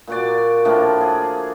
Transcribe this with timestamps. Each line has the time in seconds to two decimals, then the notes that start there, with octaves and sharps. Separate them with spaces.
0.07 A#2 F#4 D5
0.65 A2 F3 A#3 D4
1.01 G#4